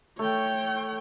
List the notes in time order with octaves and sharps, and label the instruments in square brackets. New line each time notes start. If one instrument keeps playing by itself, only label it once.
[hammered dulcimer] A3 [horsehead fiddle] C#5 G5